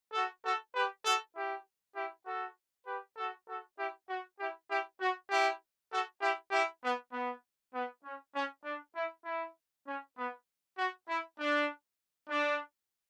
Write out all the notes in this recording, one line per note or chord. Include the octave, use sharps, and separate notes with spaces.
F#4 A4
F#4 A4
G4 B4
F#4 A4
E4 G4
E4 G4
F#4 A4
G4 B4
F#4 A4
F#4 A4
E4 G4
F#4
E4 G4
E4 G4
F#4
E4 G4
F#4 A4
E4 G4
E4 G4
B3
B3
B3
C#4
C#4
D4
E4
E4
C#4
B3
F#4
E4
D4
D4